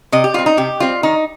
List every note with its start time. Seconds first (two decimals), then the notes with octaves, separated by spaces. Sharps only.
0.12 C3 D#5
0.24 G4
0.34 G3 C4 F4
0.46 D#4
0.57 C3 G4
0.80 G3 C4 F4
1.03 D#3 D#4